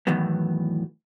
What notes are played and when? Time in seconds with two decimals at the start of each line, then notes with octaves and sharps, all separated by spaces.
0.07 E2 A2 D#3 E3 F#3 B3